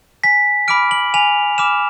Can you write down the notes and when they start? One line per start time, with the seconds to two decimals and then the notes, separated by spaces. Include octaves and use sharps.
0.23 G#5 B6
0.68 B5 D6 F6 D7
0.91 F#7
1.14 G#5 F7
1.58 B5 D6 F6 E7